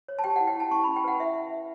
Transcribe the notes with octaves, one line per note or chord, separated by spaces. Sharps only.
C#5
A5
G4 G5
E4 F#5
G5
E4 A5
C#4 C#6
C#4 B5
G5
B4 F#5
E4 E5